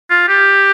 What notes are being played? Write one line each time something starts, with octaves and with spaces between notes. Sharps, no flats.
F4
G4